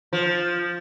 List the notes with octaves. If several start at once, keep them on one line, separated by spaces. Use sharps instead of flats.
F3